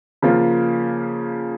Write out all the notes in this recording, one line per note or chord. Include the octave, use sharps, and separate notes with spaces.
C#3 F3 A#3 F4